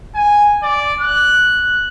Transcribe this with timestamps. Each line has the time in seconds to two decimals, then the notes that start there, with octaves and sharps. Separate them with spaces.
0.15 G#5
0.63 D5
1.01 F#6